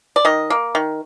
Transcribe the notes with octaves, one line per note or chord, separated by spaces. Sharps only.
D5
D#3 D#5
A#3
D#3